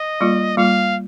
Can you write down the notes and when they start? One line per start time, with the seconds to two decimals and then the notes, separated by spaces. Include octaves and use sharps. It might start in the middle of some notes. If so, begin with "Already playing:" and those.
Already playing: D#5
0.21 G3 A#3 F4
0.57 G3 A#3 F4 F5